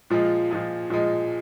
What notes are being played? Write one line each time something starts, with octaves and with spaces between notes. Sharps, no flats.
A#2 F3 G#3
A#2 F3 G#3
A#2 F3 G#3